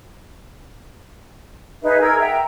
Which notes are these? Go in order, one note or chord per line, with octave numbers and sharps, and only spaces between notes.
D#4 G#4 B4 E5
G#4 A#4 E6 G#6
E5 F#5 G5 A#5